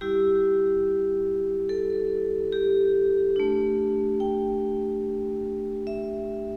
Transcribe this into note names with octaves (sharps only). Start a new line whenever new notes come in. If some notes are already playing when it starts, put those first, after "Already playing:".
G3 E4 G4
A4
G4
A3 D4
G5
E5